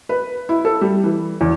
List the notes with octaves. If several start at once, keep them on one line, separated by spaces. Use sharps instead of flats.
B4
E4
A4
G3
E3
E2